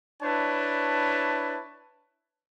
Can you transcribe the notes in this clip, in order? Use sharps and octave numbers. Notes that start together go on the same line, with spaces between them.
D4 E4 B4 C#5 A5